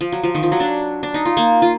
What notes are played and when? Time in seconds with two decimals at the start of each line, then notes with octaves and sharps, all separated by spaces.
0.01 F3
0.12 F#3
0.24 F3
0.35 D#3
0.43 F3
0.52 F#3
0.60 D4
1.03 D4
1.14 D#4
1.26 F4
1.37 A#3
1.62 F4